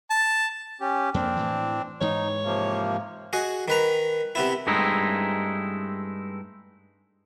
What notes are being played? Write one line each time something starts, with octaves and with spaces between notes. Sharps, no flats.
A5
C#4 G4
F2 A#3 C4 D4
A2 E3
G#2 E3 D#4 C#5
C3 F3 A#3
F#4 G#4 D#5
D#3 B4 A#5
C3 B3 E4
G2 G#3 A3 C4 D#4 E4